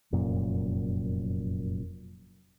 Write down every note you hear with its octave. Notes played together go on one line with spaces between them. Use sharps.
F1 F#2 A#2